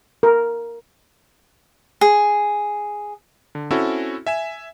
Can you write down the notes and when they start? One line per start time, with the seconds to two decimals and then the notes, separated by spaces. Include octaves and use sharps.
0.23 A#4
2.01 G#4
3.55 D3
3.71 C4 C#4 E4 F#4 A4
4.27 E5 G#5 E7